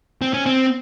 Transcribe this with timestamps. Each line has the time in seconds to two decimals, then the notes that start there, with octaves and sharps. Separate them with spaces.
0.22 C4
0.34 C#4
0.46 C4